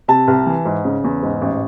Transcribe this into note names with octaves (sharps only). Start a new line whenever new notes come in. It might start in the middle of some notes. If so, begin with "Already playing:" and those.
C3 A5
C2
E3
G#2
C#3
E2
G#2
A1